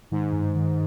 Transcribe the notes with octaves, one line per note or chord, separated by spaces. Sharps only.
G#2 D#3
G2
D#3